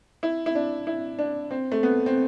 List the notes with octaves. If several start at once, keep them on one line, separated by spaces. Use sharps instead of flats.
E4
E4
D4
E4
D4
C4
A3
B3
C4